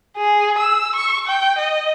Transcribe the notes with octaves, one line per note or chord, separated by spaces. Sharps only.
G#4
E6
C#6
G5
D#5